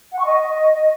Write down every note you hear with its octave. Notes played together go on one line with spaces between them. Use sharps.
F#5
C#6
D#5